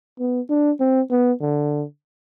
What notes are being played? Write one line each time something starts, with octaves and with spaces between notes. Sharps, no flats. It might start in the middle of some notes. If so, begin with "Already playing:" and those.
B3
D4
C4
B3
D3